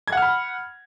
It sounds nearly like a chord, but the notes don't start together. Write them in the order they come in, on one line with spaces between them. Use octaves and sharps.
G#6 F#5 F6 B5